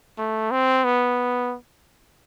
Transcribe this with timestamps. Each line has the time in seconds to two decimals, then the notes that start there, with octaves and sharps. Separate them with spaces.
0.18 A3
0.51 C4
0.84 B3